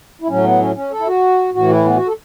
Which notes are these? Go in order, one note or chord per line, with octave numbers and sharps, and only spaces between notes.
E4
A2 F#3 C#4
B3
C#4
C#4
A4
E4
F#4
A2 E3 F#4
E4
B3
F#4
A4